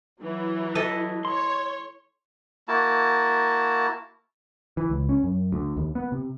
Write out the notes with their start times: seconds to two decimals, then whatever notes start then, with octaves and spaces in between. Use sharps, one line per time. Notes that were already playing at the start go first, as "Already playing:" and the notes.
0.21 E3 F#3
0.75 E4 A4 D#5
1.25 C#5 C6
2.68 A#3 E4 F#4 A5
4.77 E3
4.90 C#2
5.09 C#4
5.24 F#2
5.52 D2
5.77 D#2
5.95 B3
6.12 C3